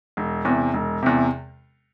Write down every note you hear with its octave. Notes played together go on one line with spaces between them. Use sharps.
E1
E2 C3
E1
E2 C3